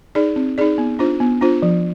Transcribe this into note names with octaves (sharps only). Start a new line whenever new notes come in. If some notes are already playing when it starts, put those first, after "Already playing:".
D#4 G#4 D5
C4
D#4 G#4 D5
B3
D4 F4 C5
B3
D4 F4 C5
F3